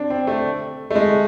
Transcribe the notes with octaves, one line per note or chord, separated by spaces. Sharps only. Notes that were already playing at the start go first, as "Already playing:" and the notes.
Already playing: C4 D4
C4
A3
A3
G#3